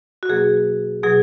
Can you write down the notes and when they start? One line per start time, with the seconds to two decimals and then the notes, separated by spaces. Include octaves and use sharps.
0.23 F#4
0.29 B2 F#3 A#3 G#4
1.03 B2 F#3 G#4